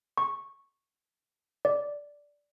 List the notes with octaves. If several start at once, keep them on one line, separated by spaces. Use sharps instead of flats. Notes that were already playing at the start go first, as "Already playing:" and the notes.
C#6
D5